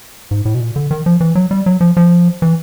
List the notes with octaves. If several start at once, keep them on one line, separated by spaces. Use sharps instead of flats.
G#2
A2
B2
A#2
D3
D#3
F3
E3
F#3
G3
F#3
F3
F3
E3